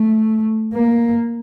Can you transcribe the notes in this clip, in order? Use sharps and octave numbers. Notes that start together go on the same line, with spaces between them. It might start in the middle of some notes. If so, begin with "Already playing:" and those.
Already playing: A3
A#3